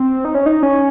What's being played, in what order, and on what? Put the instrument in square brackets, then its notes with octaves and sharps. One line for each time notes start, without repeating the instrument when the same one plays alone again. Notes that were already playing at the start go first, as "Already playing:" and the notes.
Already playing: [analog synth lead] C4
D#4
C#4
D#4
C#4